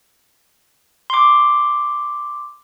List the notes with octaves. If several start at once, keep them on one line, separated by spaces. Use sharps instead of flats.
C6 D6